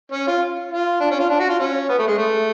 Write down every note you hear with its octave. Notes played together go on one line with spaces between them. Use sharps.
C#4
F4
F4
D4
C#4
F4
D4
F#4
F4
C#4
B3
A3
G#3
A3